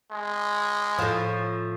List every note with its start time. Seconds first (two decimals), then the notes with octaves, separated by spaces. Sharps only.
0.11 G#3
0.98 A2 F3